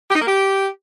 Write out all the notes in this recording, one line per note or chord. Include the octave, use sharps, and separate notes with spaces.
G4
D#4
A#3
G4